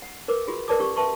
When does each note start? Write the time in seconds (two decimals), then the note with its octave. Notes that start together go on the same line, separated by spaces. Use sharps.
0.02 F#5
0.28 A#4 B4 D6
0.47 F4 F#4 G#4
0.68 A#4 B4 D5 A5 D6 D#6
0.79 C#4 G4 C#6
0.96 B4 E5 A5 C6 C#6